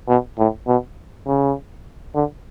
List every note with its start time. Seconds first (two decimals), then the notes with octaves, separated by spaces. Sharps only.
0.08 B2
0.39 A2
0.67 B2
1.26 C#3
2.15 D3